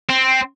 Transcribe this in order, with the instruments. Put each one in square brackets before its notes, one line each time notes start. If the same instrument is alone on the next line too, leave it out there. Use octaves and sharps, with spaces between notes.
[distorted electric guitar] C4